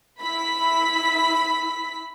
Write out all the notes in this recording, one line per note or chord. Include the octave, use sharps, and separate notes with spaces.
E4 B5 B6